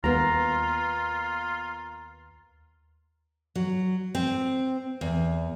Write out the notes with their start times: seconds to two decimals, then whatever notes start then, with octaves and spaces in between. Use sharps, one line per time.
0.04 D#2 A#3 B3 F4 A#5
3.55 F#3
4.15 C4
5.01 E2